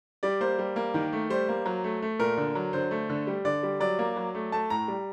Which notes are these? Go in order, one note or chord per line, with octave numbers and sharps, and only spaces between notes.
G3 D5
A#3 C5
G3
A#3
D#3
A3
G3 C5
A#3
F#3
A3
A3
A#2 A#4
D3
F#3
D3 C5
A3
D3
G3
D3 D5
G3
F#3 D5
A#3
F#3
A3
A3 A5
A2 A#5
G3